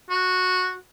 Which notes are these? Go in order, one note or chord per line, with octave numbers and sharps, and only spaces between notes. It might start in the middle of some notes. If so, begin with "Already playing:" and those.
F#4